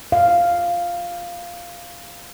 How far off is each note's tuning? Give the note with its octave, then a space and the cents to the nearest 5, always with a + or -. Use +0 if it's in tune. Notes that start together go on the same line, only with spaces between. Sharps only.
F5 -5